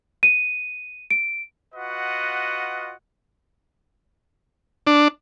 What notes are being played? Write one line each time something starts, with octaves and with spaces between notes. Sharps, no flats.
D#7
D7
F4 F#4 B4 D#5 F#5
D4